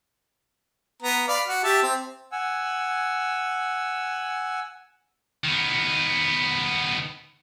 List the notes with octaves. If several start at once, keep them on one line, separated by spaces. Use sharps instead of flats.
B3 A#5
D5 F5 B5
F#4
G4 E5 A5
C4
F#5 G#5 E6
D#3 B3